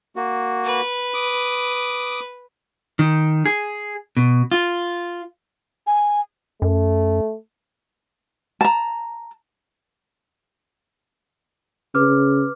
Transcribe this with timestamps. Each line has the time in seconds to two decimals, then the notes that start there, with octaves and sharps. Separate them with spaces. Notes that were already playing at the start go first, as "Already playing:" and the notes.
0.16 A#3 F#4
0.65 B4
1.14 D6 D#6
2.99 D#3
3.46 G#4
4.17 B2
4.52 F4
5.87 G#5
6.62 F#2 A3
8.61 A5 A#5
11.95 C#3 B4 D6 F6